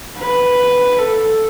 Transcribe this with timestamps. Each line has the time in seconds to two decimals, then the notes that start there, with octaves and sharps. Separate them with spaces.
0.18 B4
0.98 A4